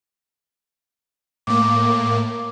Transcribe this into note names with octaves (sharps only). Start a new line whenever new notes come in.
A2 A#3 D6